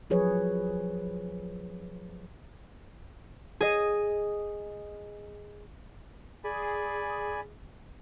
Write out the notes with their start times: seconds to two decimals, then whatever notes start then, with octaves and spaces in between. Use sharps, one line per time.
0.10 F3 F#3 G#4 B4 C#5
3.60 G#4 D#5
6.44 G#4 D5 G#5 B5